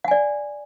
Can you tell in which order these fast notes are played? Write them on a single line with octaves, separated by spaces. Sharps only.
F#5 G#5 D5